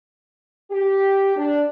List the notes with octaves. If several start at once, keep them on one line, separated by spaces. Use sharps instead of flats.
G4
D4